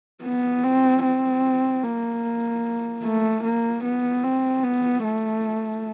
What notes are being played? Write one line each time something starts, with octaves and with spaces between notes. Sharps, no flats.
B3
C4
C4
A#3
A3
A#3
B3
C4
B3
A3